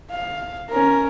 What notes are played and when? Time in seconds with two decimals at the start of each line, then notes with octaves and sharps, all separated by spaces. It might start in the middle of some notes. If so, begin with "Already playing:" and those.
0.10 F5
0.69 C#4 A#4